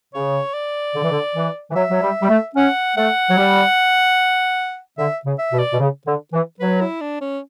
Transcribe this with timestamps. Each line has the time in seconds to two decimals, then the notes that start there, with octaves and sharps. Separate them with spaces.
0.14 C#3 C#5
0.54 D5
0.95 D3
1.03 E3
1.11 D3
1.36 E3
1.71 E3
1.75 F#3 E5
1.90 F#3
2.02 G3
2.23 G3
2.29 A3
2.56 C#4 F#5
2.97 A3 F#5
3.30 F#3
3.37 G3
4.98 D3 E5
5.26 C#3
5.39 E5
5.53 B2
5.59 D5
5.73 B2
5.79 C#3
6.06 D3
6.33 E3
6.60 F#3 B4
6.81 E4
7.01 D4
7.21 C#4